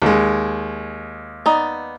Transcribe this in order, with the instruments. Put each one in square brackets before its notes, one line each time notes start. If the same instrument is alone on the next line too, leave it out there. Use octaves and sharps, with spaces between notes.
[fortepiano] D#2 G#3
[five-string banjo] B3 D#4 D5